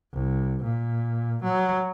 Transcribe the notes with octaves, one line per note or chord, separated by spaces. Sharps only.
C2
A#2
F#3